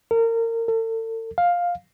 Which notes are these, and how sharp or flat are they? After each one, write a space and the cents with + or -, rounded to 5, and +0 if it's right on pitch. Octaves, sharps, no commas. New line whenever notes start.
A#4 -30
A4 +40
F5 +10